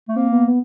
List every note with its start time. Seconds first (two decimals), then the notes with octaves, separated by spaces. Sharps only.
0.08 A3
0.16 A#3 C4
0.32 B3
0.48 B3